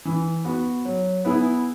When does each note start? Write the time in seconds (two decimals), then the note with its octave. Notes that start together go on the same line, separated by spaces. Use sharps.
0.05 E3
0.45 B3 F#4
0.85 F#3
1.25 B3 E4 G#4